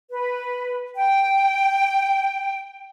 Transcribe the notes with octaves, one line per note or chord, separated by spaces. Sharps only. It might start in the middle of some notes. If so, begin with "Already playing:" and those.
B4
G5